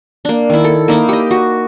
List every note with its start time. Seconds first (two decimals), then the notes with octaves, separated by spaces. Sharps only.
0.25 A#3 D4
0.50 D#3 E4
0.64 A4
0.88 A#3 D#4 E4
1.09 G4 D#5
1.31 F#4